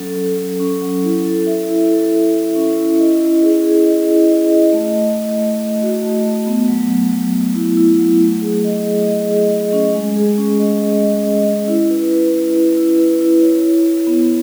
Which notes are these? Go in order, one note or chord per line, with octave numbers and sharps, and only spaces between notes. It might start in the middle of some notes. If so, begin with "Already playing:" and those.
Already playing: F#3 C#4 A4
A4
A4
C#4
F#3
E4
A4
E5
E4
A4
A4
E5
C#4
E4
D#5
E4
G#4
G#4
D#5
E4
D#5
D#5
A3
A3
A3
A3
A3
F#4
A3
A3
B3
F#3
F#3
F#3
F#3
E4
E4
F#3
A3
G#4
D#5
G#4
D#5
G#4
D#5
C#4
G#3
G#4
C#4
D#5
D#5
D#5
D#5
C#4
E4
B4
B4
E4
E4
E4
B4
E4
C#5
C#5
C#5
B3